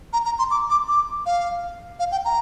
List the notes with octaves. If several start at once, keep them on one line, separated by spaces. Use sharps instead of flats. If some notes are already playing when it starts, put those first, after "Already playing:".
A#5
A#5
C6
D6
D6
D6
F5
F5
G5
A#5